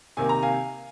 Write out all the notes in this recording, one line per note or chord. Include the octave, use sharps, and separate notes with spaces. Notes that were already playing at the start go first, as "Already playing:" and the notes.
C3 D#3 A#3 G#5
A#5
F5 G#5